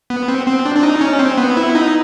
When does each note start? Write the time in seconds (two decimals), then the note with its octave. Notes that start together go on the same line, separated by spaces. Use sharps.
0.10 B3
0.28 C4
0.47 C4
0.65 D4
0.76 D4
0.83 D#4
1.01 C#4
1.19 C4
1.38 B3
1.57 E4
1.75 D#4